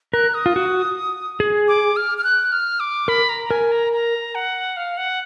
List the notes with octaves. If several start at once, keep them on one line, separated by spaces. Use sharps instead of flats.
A#4 F#6
D#6
F4
F#4
G#4
D6
F6
F6
F#6
F6
D6
A#4 B5
A#5
A#5
A#4 G#5
A#5
A#5
F#5
F5
F#5